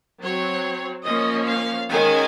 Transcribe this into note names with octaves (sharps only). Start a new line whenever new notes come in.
F#3 C4 C#5
F3 A#3 C#4 D#5
F5
D#3 G#3 C#4 G#5